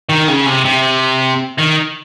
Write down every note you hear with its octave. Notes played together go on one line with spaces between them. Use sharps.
D#3
C#3
C3
C3
D#3